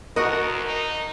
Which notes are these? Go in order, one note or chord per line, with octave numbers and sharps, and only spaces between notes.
D2 F#4 A#4 D#5
D#4